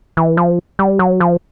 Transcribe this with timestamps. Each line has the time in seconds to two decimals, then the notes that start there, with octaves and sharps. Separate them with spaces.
0.17 E3
0.37 F3
0.79 G3
0.99 F#3
1.20 F3